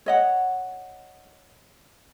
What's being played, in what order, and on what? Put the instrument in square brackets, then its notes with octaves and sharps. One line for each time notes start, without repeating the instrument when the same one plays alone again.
[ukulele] C#5 D#5 F#5